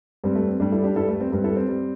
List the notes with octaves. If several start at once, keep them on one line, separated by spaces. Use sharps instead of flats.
G2 G3 C4
A3
C4
G2 G3 A3 D4
E4 A4
D4 G4
G2 G3 E4 A4
A3
C4
G2 G3 C4
E4 A4
C4
G3